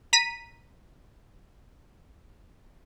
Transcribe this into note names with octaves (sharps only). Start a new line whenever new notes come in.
A#5 B6 D#7